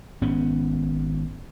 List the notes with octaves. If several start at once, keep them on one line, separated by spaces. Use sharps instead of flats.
G#1 G#2 B3 C#4